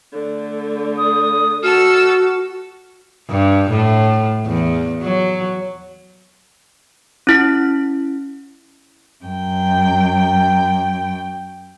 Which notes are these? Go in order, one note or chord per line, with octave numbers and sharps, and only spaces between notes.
D3 A3
D#6
F#4 A4 E6 F6
G2
A2
E2
F#3
C#4 E4 B6
F#2 G5